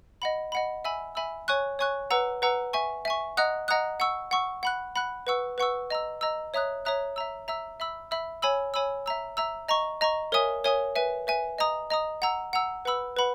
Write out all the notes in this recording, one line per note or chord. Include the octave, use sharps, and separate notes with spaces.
D#5 F#5 B5
D#5 F#5 B5
E5 G#5 B5 E6
E5 G#5 B5 E6
C#5 G#5 C#6 F#6
C#5 G#5 C#6 F#6
B4 F#5 A#5 E6
B4 F#5 A#5 E6
E5 G#5 C#6
E5 G#5 C#6
D#5 F#5 A#5 D#6 F#6
D#5 F#5 A#5 D#6 F#6
F#5 C#6 E6
F#5 C#6 E6
F#5 B5 F#6
F#5 B5 F#6
B4 F#5 C#6 E6
B4 F#5 C#6 E6
D#5 A#5 E6
D#5 A#5 E6
C#5 E5 A#5 D#6 F#6
C#5 E5 A#5 D#6 F#6
E5 A#5 E6
E5 A#5 E6
E5 B5 E6
E5 B5 E6
C#5 G#5 B5 E6
C#5 G#5 B5 E6
E5 A#5 E6
E5 A#5 E6
D#5 A#5 C#6
D#5 A#5 C#6
A#4 C#5 E5 G#5 D#6
A#4 C#5 E5 G#5 D#6
B4 E5 G#5
B4 E5 G#5
D#5 A#5 D#6
D#5 A#5 D#6
F#5 A#5 E6
F#5 A#5 E6
B4 F#5 B5 E6
B4 F#5 B5